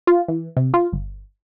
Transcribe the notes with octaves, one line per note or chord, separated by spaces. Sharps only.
F4
E3
C3
F4
G1